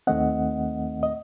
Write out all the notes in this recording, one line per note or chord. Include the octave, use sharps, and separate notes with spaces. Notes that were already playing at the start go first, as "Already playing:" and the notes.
D#2 D#3 A3 C4 D#5 F#5
D#5